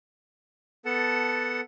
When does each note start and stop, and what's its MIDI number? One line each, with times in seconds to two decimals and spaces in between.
0.85 1.60 59
0.85 1.60 69
0.85 1.60 78
0.85 1.60 81